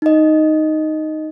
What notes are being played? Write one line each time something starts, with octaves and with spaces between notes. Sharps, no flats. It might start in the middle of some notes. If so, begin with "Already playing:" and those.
D#4 D#5